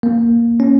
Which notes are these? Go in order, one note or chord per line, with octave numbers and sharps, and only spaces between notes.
A#3
C#4